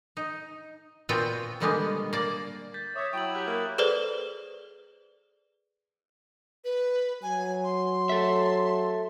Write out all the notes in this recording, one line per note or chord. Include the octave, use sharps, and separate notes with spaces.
D#4
A#2 B3 C4 F4 F#4 G5
B2 D3 G3 G#3 A#3 B3
A#3 D5
G6 A6 B6
C#5 E5 D6 D#6
F#3 E4 G5 C#6 F#7
G4 F#6
A#3
G#4 A4 B4 C5 D5
B4
F#3 G#5
C6
A4 E5